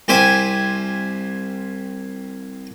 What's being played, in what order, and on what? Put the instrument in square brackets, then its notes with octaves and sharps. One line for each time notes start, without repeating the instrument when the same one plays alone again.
[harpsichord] C2 G4 C5 E5 G#5